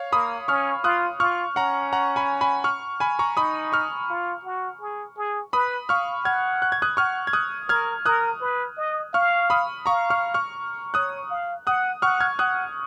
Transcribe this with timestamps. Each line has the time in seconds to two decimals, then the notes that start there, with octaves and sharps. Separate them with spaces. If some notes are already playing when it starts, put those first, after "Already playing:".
Already playing: C#5 F5
0.12 A#3 B5 D#6
0.48 C#4 C#6 F6
0.84 F4 D#6 F#6
1.20 F4 C#6 F6
1.56 C#4 F#5 A#5
1.93 F#5 A#5
2.16 G#5 B5
2.41 G#5 B5
2.64 C#6 F6
3.00 G#5 B5
3.19 A#5 C#6
3.37 D#4 B5 D#6
3.72 C#6 F6
4.09 F4
4.45 F#4
4.81 G#4
5.17 G#4
5.53 B4 B5 D#6
5.89 F5 C#6 F6
6.25 F#5 F6 G#6
6.62 F#6
6.72 G#6
6.82 D#6 F#6
6.97 F#5 C#6 F6
7.27 G#6
7.33 D#6 F#6
7.69 A#4 F6 G#6
8.06 A#4 D#6 F#6
8.41 B4
8.78 D#5
9.14 F5 C#6 F6
9.50 B5 D#6
9.86 F5 A#5 C#6
10.10 C#6 F6
10.34 C#6 F6
10.94 C#5 D#6 F#6
11.30 F5
11.67 F#5 D#6 F#6
12.02 F#5 C#6 F6
12.20 F6 G#6
12.39 F#5 D#6 F#6